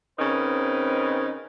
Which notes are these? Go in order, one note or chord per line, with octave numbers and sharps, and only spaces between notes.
C#3 C4 D#4 A#4 B4